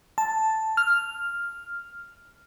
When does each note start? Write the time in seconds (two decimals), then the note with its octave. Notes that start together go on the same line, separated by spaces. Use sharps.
0.18 A5
0.77 F6